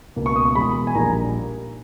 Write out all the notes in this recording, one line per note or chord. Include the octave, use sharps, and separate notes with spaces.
C#2 B2 A#3
C#6
D#6
C#6
E2 B2 G#3 B5
G#5
A#1 A#2 G3 A#3 D#4 A#5